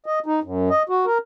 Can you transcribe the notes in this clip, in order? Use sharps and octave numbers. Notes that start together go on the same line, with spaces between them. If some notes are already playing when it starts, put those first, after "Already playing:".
D#5
D#4
F#2
D#5
F#4
A#4